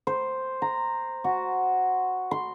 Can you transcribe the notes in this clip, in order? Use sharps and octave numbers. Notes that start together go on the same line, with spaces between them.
C5
A#5
F#4
C6